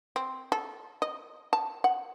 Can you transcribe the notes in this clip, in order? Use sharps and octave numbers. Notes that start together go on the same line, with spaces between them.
C4
A4
D#5
A5
F#5